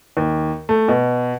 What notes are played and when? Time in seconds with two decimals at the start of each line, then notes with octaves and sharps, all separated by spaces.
0.17 D#2
0.69 A3
0.88 B2